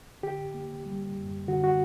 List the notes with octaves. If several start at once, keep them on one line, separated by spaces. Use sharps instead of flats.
D3 G4
A#3
G3
F#2
D3 F#4
F#4